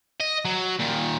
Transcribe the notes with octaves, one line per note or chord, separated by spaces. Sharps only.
D#5
F#3
A#2 D#3